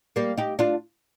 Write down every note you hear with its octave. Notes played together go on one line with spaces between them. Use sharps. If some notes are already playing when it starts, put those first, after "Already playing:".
G3 A#3
D#4 G4
D4 F4